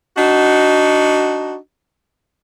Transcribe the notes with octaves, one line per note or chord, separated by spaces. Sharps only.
D4 D#4 F#4